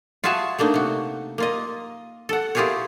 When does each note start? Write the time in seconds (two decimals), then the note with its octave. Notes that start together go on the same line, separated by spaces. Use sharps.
0.24 F4 F#4 G#4 E5 G#5 A5
0.59 A3 A#3 D4 D#4
0.74 C3 F#4
1.38 A#3 F4 D#5
2.29 A4 F#5
2.55 E4 F4 G4 G#4 A#4 C#5